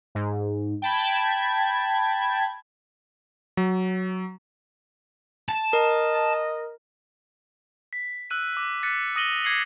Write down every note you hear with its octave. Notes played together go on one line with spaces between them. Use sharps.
G#2
G5 A5 B5 G#6
F#3
A5
A#4 D#5
B6
E6 F#6 D#7
D6
F#6 A6 B6 C#7 D#7
D#6 A#6 D#7 F#7 G7
D6 G#6 A#6 C7 C#7 F#7